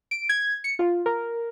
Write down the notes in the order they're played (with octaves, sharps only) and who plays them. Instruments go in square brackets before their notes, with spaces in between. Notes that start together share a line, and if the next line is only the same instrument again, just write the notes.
[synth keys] D7
G#6
C#7
F4
A#4